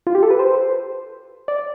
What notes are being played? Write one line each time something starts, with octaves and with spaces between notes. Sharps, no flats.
F4
G4
A4
B4
C5
D5